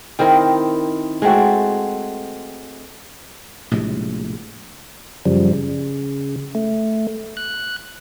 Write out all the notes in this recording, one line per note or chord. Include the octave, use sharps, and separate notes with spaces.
D#3 C4 E4 A#4
G#3 A3 C4 F#4
A#1 A2 C3 G#3
F#2 C#3 F3 G3
C#3
A3
F#6